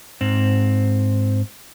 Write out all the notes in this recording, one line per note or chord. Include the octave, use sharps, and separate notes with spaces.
G#2 C4